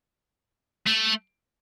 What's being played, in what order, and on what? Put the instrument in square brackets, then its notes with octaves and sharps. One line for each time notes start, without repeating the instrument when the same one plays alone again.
[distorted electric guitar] A3